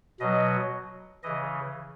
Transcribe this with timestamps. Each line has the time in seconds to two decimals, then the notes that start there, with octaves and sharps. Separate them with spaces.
0.20 B2 F#3 D#5
1.23 C#3 E3 D#5